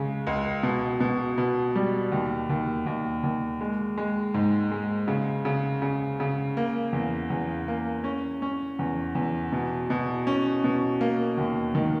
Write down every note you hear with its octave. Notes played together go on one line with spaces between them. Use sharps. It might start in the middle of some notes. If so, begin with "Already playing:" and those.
Already playing: C#3 G#3
C#2
B2
B2
B2
G3
D#2
D#2
D#2
D#2
G#3
G#3
G#2
G#3
C#3
C#3
C#3
C#3
A#3
E2
E2
A#3
C#4
C#4
E2
E2
B2
B2
C#4
B2
A#3
D#2
D#3